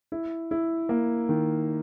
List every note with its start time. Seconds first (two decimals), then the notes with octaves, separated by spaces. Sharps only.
0.12 E4
0.51 E4
0.89 A#3
1.29 D#3